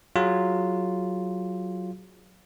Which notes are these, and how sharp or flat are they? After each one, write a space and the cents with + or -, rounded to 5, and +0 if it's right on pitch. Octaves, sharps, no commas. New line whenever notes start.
F#3 +0 F4 +0 G#4 +0